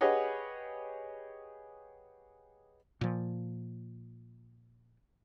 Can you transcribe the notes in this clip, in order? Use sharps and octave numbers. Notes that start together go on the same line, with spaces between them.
G4 G#4 B4 C#5 D#5 F#5
A#2 F3